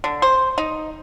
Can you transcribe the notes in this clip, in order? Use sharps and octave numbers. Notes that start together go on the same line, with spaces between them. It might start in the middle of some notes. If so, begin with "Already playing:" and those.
D3
C5
D#4